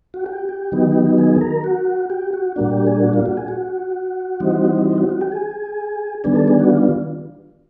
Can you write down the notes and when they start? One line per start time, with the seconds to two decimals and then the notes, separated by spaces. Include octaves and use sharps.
0.14 F#4
0.26 G4
0.49 G4
0.72 D#3 F#3 B3 D#4
1.18 G#4
1.41 A#4
1.64 F#4
2.10 G4
2.33 F#4
2.56 A#2 G3 A#3 D4 F#4
2.71 G4
2.86 G#4
3.02 F#4
3.13 F4
3.26 F#4
3.37 G#4
3.48 F#4
4.40 E3 G3 C4 D#4
4.98 F#4
5.09 F#4
5.21 G4
5.32 G#4
6.24 D#3 G3 B3 D4 G#4
6.35 A4
6.48 G#4
6.59 F#4
6.70 F4